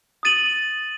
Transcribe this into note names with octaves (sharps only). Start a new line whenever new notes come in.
D#6 A6 D#7 F#7